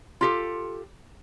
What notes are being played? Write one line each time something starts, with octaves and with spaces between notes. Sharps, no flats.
F4 G4 A4